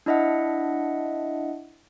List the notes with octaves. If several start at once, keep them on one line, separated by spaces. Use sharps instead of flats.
D4 E4 D#5 E5 F#5